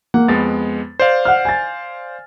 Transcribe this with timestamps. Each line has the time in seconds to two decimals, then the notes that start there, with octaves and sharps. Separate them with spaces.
0.14 A#3 F#5
0.28 F2 G#3 B3 A6
1.00 C5 D5 F5
1.25 F#5 F6
1.45 G#5 A6